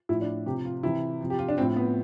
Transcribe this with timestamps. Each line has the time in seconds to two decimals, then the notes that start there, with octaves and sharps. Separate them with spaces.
0.09 A2 F3 E4
0.21 D4
0.46 C3 F3 G4
0.65 F4
0.83 C3 E3 E4
1.21 C3 F3
1.30 G4
1.39 F4
1.49 D4
1.58 A2 F3 C4
1.76 B3